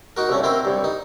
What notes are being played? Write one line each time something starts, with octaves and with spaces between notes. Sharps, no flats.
D#4 F#4 A#4
C2 A3 C#4
C4 E4 A#4 C5
C2 G2
D#4